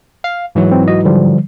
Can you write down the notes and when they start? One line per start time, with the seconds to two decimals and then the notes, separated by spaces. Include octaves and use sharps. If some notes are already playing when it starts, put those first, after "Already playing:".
0.24 F5
0.55 G#2 E3 F#3
0.72 C4
0.88 F#4 D#5
1.05 D3 F3 G3